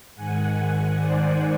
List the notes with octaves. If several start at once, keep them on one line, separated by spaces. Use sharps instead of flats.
G#2 D#3 F#5 G#5
C5 D5